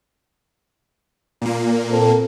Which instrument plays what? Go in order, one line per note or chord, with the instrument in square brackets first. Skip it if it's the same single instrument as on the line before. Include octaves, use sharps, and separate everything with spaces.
[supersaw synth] A#2 A#3
[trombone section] C4 A4